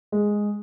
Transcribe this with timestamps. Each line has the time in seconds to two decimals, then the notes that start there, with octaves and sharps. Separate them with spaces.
0.12 G#3